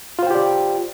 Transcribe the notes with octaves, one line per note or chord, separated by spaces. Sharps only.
F4 G4 C5 D5 G5